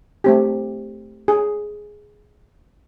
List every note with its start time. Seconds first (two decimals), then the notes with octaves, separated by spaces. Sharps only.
0.24 A3 C4 G4
1.28 G#4